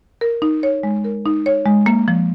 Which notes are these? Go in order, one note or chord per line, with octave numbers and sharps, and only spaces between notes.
A#4
D#4
C#5
G#3
A#4
D#4
C#5
G#3
A#3
F3